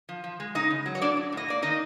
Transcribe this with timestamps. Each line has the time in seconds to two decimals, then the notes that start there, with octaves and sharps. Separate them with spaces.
0.09 F3
0.24 F3
0.40 G#3
0.55 C#3 D#4 D#5
0.70 C#3
0.86 F#3
0.95 C#5
1.01 A2 D4 D5
1.17 F#3
1.32 A2 D#5
1.48 A#3 D5
1.62 D#3 D#4 D#5